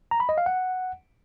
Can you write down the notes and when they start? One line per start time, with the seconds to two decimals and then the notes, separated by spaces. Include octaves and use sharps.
0.11 A#5
0.20 B5
0.29 D#5
0.38 F5
0.46 F#5